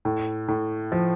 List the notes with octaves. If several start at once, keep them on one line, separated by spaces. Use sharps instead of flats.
A2
A2
F3